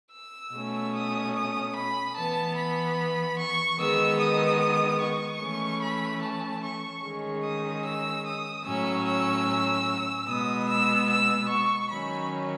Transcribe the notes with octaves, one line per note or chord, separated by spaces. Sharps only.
E6
B2 A3 C#4
D#6
D#6
B5
E3 B3 A5
B5
C#6
D#3 G#3 B3 E6
D#6
C#6
E3 A3 C#4
B5
A5
C#6
D#3 G#3 C#4
D#6
E6
D#6
A2 F#3 C#4 E6
E6
B2 G#3 B3 D#6
E6
E6
C#6
D#3 F#3 C#4 B5